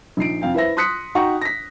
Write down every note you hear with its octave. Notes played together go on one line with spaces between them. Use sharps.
A#1 D#4 C7 D7
F2 F5 G5
E4 B4 C5 E5 A#6
C6 D#6 F#6 B6 C#7
D#4 F#4 F#5 G5 A#5 C#6
A#6 B6